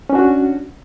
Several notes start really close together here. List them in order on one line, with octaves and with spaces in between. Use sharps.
C#4 D4 F#4